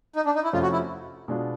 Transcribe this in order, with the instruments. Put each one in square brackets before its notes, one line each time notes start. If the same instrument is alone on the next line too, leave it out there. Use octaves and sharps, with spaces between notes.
[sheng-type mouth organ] D#4
D4
D#4
E4
[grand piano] F2 C3 F3 A3 C#4 [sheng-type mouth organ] F4
[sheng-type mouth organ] F#4
E4
[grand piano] B2 G#3 B3 D4 F4